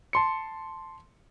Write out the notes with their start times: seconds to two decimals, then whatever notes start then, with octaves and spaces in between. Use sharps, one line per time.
0.13 A5 C6 C#7